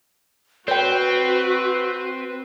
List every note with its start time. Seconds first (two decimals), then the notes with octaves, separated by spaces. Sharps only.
0.68 C4 F#4 B4 C#5 G5